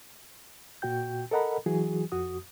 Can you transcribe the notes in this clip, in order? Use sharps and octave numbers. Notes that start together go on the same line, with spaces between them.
A#2 F#4 G5 G6
A4 A#4 D#5 F#5 A#5 B5
E3 F#3 F#4 G#4
F2 F#4 D#6